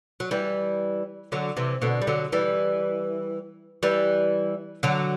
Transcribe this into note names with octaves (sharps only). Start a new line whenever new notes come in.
F#3
E3 G3
D3 F#3
C3 E3
B2 D3
G3
D3 F#3
E3 G3
E3 G3
D3 F#3